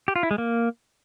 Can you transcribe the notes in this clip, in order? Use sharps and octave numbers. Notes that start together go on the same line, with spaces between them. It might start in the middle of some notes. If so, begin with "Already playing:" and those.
G4
F4
E4
G#3
A#3